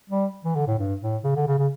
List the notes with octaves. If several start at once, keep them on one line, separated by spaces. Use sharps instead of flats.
G3
E3
D3
A2
G2
A2
C#3
D3
C#3
C#3